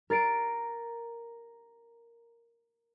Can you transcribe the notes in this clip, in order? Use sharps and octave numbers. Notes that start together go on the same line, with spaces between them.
A#4 A6 C7 D7